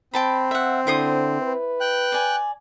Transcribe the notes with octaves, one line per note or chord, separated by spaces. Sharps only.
C4 G5 A5 B5
E5 F#5
D3 E4 C5 D#6
B4
G5 F#6
D5 G#5